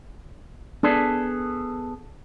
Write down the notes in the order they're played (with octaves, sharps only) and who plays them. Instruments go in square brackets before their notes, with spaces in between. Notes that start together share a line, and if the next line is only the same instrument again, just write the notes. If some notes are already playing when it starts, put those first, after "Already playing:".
[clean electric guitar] B3 G#4 A4 [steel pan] D4